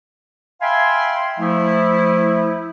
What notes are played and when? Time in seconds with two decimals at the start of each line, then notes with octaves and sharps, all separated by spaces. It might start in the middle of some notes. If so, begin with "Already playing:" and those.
0.62 E5 F5 G5 G#5 B5 C6
1.39 F3 A3 E4